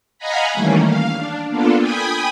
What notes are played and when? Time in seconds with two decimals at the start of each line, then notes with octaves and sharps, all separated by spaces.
0.18 D#5 F5 F#5 G#5 A#5 B5
0.53 D#3 E3 G3 A3 A#3 C#4
0.83 F5
1.15 D4
1.49 A#3 B3 D4 F4 A4
1.78 G5 G#5 B5 D#6